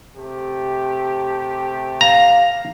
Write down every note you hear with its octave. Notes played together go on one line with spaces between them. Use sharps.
C3 A3 G4
F5 A#5